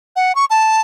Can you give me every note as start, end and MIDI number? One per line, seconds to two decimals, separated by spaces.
0.16 0.35 78
0.35 0.45 85
0.50 0.81 81